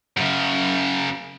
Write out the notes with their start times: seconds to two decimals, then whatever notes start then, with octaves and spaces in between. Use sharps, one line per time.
0.17 F#2 C#3